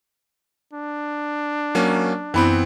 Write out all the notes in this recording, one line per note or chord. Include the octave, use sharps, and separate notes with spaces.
D4
F#3 A#3 C#4
F#2 E3 B3 C4 E4 B5